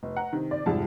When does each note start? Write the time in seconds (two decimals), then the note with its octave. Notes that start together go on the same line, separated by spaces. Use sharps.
0.03 F1
0.17 F#5 A#5
0.33 C3 D#3
0.51 D5
0.66 C2 F2 G#2 G#3 A5